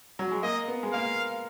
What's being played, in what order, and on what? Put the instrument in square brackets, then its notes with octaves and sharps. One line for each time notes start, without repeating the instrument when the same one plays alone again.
[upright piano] F#3
G#3
[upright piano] A#3 [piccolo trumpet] D#5
[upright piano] B3
G#3
[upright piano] A#3 [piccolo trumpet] F5